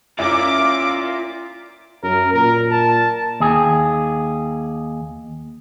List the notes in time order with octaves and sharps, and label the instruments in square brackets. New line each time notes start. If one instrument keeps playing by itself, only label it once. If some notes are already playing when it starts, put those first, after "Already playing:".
[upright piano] C#4 E4 [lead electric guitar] F4 D5 [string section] D6
[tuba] F#2 [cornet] A#4
[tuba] A#2 [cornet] A#4
[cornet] A5
[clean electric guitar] D#2 G#4